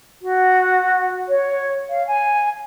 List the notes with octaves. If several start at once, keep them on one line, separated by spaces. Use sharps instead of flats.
F#4
C#5
F5
G#5